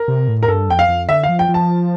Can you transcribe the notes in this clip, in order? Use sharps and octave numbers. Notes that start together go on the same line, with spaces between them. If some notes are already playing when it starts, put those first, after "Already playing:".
Already playing: A#4
C3
A2
A#4
G2 A4
F2 G5
F5
F2
D3 E5
F5
F3
G5
F3
A5